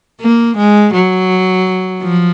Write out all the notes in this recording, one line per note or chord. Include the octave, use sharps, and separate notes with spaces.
A#3
G#3
F#3
F3